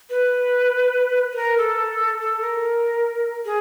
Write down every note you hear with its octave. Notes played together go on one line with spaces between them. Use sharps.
B4
B4
A#4
A4
A4
A#4
G#4